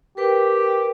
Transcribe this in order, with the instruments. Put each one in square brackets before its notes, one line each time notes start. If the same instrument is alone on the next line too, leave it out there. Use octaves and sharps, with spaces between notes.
[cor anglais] G4 [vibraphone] A#4 B4 G5